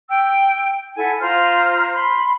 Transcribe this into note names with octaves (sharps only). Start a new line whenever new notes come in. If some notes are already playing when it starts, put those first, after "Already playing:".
G5 E6
E4 A4 F#5 G#5
F4 C5 A#5 F6
B5 C6